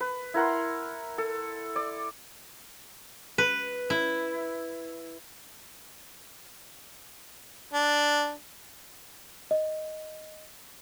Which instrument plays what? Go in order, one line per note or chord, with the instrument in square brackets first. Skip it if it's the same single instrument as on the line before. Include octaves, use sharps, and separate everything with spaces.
[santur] B4
E4 A#4 F#5 C6
A4
D5
[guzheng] B4
E4
[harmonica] D4
[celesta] D#5